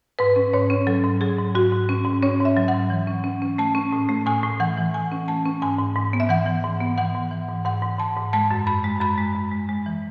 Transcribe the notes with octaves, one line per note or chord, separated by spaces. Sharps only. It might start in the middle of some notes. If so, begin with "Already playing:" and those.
G#2 B4
C#4
G#2 C#5
C#4
F#3 A4
G#2
F#3 G#4
G#2
G#2 F#4
G#2
C#4
G#2
C#4 C#5
G#2 E5
F#3
F#5
G#2
E3
C#4
C#4
C#4
A3 A5
C#4
A2
A3
A2 G#5
A2
E3 F#5
E3
A2 G#5
C#4
A3 A5
C#4
G#2 G#5
G#2
G#2
B3
E5
E3 F#5
E3
G#2
B3
E3 F#5
G#2
E3
G#2
G#2 F#5
G#2
G#2 A5
G#2
G#3 A5
F#2
F#2 B5
G#3
F#2 B5
G#3
F#2
G#3
G#3
E3